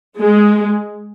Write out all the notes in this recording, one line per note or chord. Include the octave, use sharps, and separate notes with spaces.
G#3